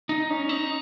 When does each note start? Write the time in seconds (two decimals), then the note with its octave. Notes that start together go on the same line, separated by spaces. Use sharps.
0.09 D#4
0.30 C#4
0.49 D#4